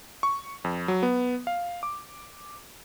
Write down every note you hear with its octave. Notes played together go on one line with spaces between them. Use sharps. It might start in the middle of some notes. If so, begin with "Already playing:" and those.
C#6
F2
F#3
B3
F5
D6